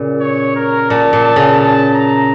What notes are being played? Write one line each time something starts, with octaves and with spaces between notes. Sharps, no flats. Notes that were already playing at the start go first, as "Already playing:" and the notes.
Already playing: A#2 C#3
C#5
A#4
A#2 A5
A#2
A5
C#3
A5
A#5